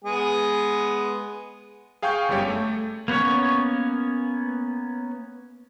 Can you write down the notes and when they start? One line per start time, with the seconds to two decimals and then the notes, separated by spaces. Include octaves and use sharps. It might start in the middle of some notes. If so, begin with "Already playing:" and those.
0.04 G#3 B3 G#4
2.02 G#4 F5 G5 G#5 C#6 G6
2.28 G1 F#2 G3 G4 C#5
2.48 A3
3.08 A#3 B3 C#4 C#5